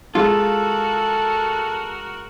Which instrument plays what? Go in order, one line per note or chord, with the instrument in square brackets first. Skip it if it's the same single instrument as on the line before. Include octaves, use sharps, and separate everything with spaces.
[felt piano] G#3 F5 E6 [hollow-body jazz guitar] F4 [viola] F#4 A#4 [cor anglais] A4